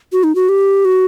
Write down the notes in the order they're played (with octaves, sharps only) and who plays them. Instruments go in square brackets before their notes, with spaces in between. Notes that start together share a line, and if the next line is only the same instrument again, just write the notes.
[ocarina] F#4
D#4
F#4
G4
F#4